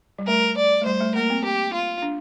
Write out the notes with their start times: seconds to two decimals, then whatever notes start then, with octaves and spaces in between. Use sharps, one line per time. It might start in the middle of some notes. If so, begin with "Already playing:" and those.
0.19 G3
0.27 A3 A#4
0.57 D5
0.82 A3
0.85 G3 C5
1.01 A3
1.15 A#3 A#4
1.30 C4
1.44 G4
1.73 F4
2.02 D4